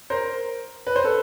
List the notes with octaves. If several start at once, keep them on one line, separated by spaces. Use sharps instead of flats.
A#4 C5
B4
C5
A4 B4